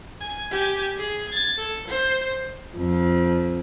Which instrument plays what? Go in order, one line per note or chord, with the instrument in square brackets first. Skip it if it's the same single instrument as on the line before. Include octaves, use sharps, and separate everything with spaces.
[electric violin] G#5
G4 G#5
G#4
G#6 A6
A4
C5
[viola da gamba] F2